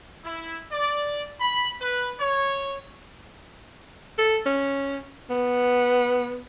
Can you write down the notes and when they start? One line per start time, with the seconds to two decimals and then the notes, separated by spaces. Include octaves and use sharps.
0.24 E4
0.72 D5
1.41 B5
1.80 B4
2.19 C#5
4.18 A4
4.46 C#4
5.30 B3